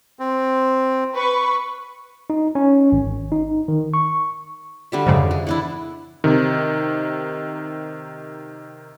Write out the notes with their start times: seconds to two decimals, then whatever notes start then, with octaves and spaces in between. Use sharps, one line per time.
0.19 C4
1.15 B4 C#6
2.30 D#4
2.55 C#4
2.92 G#1
3.32 D#4
3.68 D#3
3.94 C#6
4.92 D3 G3 E5
5.06 F2 G#2 C#3
5.31 G#3
5.47 E3 D4 E4
6.24 C3 D#3